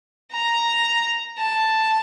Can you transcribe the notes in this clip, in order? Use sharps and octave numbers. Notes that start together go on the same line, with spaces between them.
A#5
A5